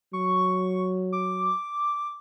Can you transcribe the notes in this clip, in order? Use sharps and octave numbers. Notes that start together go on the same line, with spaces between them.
F#3 C#6
D6